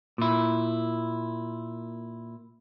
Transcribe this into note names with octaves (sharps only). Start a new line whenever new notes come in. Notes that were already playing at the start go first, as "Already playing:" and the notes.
A#2 E4